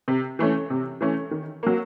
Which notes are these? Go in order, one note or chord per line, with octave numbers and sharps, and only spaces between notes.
C3
E3 A3 C#4
C3
E3 A3 C#4
D#3
F#3 A#3